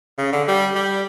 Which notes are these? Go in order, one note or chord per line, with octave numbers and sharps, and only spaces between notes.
C#3
D3
G3
G3